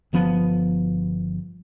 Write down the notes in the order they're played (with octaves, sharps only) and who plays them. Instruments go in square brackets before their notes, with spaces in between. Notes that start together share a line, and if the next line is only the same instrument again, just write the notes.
[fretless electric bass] G1 F3 B3